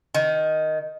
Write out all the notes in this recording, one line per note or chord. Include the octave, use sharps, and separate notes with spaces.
D#3